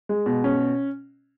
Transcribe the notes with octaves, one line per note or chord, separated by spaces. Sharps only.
G#3
B2
C#4